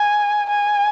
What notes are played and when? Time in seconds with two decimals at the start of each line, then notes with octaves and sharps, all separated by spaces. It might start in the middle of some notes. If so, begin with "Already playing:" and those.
Already playing: G#5
0.49 G#5